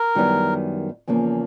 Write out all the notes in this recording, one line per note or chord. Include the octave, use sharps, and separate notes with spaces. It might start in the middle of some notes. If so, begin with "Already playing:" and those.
Already playing: A#4
F#2 D#3 G3 B3 E4
E2 C#3 F3 A#3